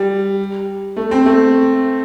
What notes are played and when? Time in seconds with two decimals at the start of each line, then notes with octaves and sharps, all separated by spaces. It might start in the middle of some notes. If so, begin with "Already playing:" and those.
Already playing: G3
0.97 A3
1.11 C4
1.26 A3